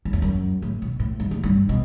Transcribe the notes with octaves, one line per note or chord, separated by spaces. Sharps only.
F#2
E2
F#2
A2
B2
A2
G2
A2
G2
B2